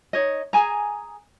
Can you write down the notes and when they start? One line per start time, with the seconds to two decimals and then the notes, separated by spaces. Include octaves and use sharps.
0.13 D#4 C#5 D#5
0.53 G#4 G#5 A#5